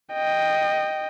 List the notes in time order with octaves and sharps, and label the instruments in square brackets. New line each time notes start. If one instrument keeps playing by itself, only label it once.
[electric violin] D#5 G5